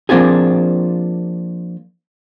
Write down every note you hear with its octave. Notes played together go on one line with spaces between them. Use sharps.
F3 A#3 C4 D4 F4 G#4